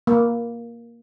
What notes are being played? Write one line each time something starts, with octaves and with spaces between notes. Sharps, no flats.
A#3